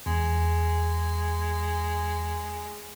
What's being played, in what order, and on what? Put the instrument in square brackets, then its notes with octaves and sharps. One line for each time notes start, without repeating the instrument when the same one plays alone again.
[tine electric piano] E2 [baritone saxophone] G#3